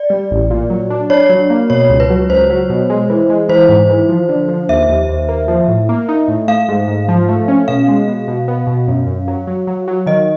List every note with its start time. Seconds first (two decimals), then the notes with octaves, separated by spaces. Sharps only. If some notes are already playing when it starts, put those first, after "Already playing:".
Already playing: D5
0.10 G3
0.31 A1
0.50 A#2
0.70 F#3
0.90 D4
1.10 D4 C#5
1.30 F#3
1.50 A#3
1.70 B2 C#5
1.89 C#2
2.00 B4
2.10 F#3
2.29 C#2 C5
2.50 F#3
2.70 B2
2.90 G#3
3.10 E3
3.29 G#3
3.49 E3 C5
3.69 G#2
3.90 E3
4.09 F3
4.29 D3
4.48 F3
4.69 D#2 E5
4.89 D#2
5.09 D#2
5.29 A#3
5.48 F3
5.68 A2
5.89 A#3
6.09 D#4
6.28 A2
6.48 A3 F5
6.69 G#2
6.88 G#2
7.08 F3
7.28 A3
7.48 C#4
7.68 B2 F5
7.88 G#3
8.08 B2
8.28 B2
8.48 B3
8.67 B2
8.88 F#2
9.07 F#2
9.28 F#3
9.47 F#3
9.67 F#3
9.88 F#3
10.07 D#3 D#5